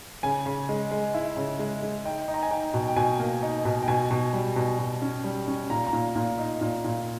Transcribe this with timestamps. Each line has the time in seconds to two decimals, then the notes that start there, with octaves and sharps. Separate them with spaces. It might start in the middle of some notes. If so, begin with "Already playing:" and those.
0.23 C#3 G#5
0.46 C#3
0.69 G#3
0.91 G#3
1.14 E4
1.37 C#3
1.59 G#3
1.83 G#3
2.05 D#4 G5
2.28 D#4
2.34 A#5
2.43 G#5
2.51 D#4 G5
2.74 B2
2.88 G5
2.96 B2 G#5
3.19 A#3
3.43 D#4
3.65 B2
3.82 G5
3.88 B2 G#5
4.11 B2
4.33 G3
4.56 B2
4.79 B2
5.02 C#4
5.24 G3
5.47 C#4
5.70 A#2 A#5
5.87 A#5
5.93 A#2
6.16 A#2
6.39 D#4
6.61 A#2
6.84 A#2